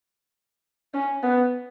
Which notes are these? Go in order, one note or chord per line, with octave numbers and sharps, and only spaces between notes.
C#4
B3